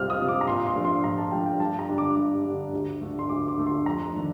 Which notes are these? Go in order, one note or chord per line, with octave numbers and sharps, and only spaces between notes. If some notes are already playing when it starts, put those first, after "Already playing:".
Already playing: C2 C3 G3 C4 F4 F6
D#6
C3 G3 C4 F4
D6
A#5
A#2 C6
C6
F3 A3 D4
C6
A#2 A#5
A5
F3 A3 D4 G5
G5
G2 A5
A#5
D3 G3 D4
D6
G2
D3 G3 D4
D2
D3 A3
C6
D2 D6
D6
D3 A3
C6
F2 A#5
D#3 A3 D4